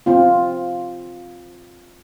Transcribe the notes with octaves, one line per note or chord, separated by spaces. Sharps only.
C4 F4